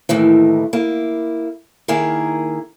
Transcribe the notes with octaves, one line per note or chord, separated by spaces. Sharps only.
D#2 A2 D#3 E3
A#3 E4
D#3 A#3 E4 G#4 A#4